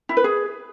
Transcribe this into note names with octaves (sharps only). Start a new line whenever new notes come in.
E4
B4
G#4